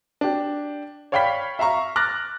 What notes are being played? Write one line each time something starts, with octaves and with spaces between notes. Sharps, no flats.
D4 G4
C#5 D5 F5 G5 B5 B6
E5 F5 A#5 C#6
D6 F6 F#6 A6 A#6